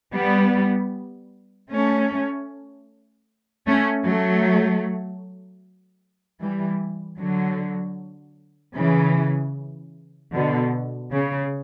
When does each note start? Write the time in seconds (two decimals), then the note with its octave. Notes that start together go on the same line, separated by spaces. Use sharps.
0.13 G3 B3
1.71 A3 C#4
3.67 A3 C#4
4.06 F#3 A3
6.41 E3 G3
7.19 D3 F#3
8.76 C#3 E3
10.34 B2 D3
11.12 C#3